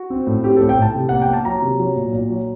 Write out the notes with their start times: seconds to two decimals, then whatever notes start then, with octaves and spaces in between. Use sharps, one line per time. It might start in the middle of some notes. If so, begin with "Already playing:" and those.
Already playing: F#4
0.10 C4
0.27 A2
0.44 C4 G4
0.56 A2 A4
0.69 G5
0.78 A2 A5
0.95 C3
1.09 A#3 F#5
1.22 G5
1.28 A#3 A5
1.45 F#3 A#5
1.62 C3
1.79 F#3
1.96 A#2
2.13 A#2
2.30 F#3